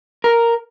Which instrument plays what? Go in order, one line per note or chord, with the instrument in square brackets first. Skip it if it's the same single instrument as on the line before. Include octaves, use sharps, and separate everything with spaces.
[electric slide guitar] A#4